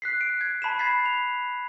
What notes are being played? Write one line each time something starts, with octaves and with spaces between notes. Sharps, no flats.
F#6 B6 C7
F#6 D7
G#6
A5 B5 B6 E7
B5 G#6 A6 B6 C7
F7